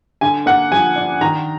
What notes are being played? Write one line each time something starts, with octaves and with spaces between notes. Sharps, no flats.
D3 G#5
A#3 F#5
F3 G#5
D4
D#3 A#5